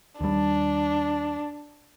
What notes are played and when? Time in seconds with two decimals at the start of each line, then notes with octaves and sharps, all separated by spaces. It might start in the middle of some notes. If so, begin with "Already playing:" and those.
0.21 D#2 G3 D4